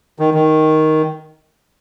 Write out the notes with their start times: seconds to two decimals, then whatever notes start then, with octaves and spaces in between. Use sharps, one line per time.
0.19 D#3
0.34 D#3